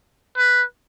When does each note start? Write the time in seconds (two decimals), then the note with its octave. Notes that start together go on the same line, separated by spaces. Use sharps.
0.37 B4